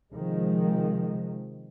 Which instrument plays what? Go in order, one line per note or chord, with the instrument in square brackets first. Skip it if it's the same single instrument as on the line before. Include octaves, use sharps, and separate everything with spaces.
[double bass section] C3 D#3 F3 G#3